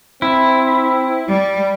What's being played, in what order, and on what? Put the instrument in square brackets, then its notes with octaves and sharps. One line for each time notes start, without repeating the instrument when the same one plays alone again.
[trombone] C4 [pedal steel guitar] E4
[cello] G3